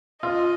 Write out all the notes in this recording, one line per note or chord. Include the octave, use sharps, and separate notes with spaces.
F4 D#5